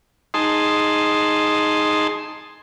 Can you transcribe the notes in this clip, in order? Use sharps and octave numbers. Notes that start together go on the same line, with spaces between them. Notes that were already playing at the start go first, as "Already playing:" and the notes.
D#4 G#4 A5 C6